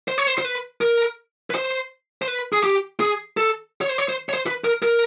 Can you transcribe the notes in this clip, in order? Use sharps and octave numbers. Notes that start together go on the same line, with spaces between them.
C5
C#5
C5
C5
B4
A#4
B4
C5
C5
B4
G#4
G4
G#4
A4
C#5
C5
C#5
C5
C#5
C5
B4
A#4
A#4